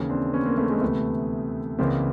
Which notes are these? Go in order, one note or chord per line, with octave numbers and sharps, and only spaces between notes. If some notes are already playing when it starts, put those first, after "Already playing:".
Already playing: D#2 C#3 E3
C4 D4
B3 C#4
A#3 C4
A3 B3
G#3 A#3
D2 C3 E3 A3 B3
C#2 C#3 E3 A#3 C4